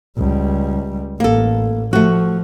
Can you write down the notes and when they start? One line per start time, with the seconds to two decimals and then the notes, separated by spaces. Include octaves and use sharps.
0.17 C#2 G3
1.20 A1 A#3 A4
1.93 F3 A3 F#4